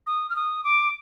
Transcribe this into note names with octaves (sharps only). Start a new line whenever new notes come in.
D#6
F6
D#6
D6